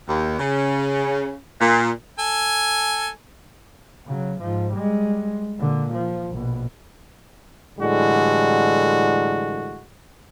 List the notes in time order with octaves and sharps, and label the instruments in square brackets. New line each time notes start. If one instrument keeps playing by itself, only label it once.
[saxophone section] D#2
C#3
A#2
[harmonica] A4 G#5
[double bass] C#3 F#3
G#2 F3
G3 G#3
A#2 D3
F3
A#1 B2
[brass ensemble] A2 D3 E3 G3 G#3 F#4